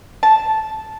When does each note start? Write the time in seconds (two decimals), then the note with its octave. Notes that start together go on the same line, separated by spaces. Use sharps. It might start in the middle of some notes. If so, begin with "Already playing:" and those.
0.23 A5